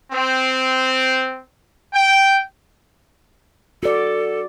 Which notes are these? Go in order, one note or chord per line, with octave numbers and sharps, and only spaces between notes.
C4
G5
F#4 A4 D5